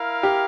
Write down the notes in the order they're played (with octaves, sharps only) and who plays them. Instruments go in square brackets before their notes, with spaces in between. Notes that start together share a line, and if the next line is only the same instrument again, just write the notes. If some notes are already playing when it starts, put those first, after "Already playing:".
Already playing: [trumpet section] E4 A#4 F5
[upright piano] G4